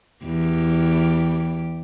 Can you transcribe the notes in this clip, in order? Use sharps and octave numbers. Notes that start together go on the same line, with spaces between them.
E2 G4